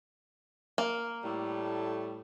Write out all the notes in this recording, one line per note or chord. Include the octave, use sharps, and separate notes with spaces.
A#3
A2 G3 A3